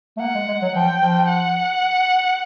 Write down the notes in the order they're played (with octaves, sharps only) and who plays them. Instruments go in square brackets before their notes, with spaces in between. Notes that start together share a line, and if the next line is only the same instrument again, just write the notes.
[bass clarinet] A3
[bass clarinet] A#3 [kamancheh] F#5
[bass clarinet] G#3
G#3
F#3
[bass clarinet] F3 [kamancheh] G5
[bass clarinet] F3
[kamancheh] F#5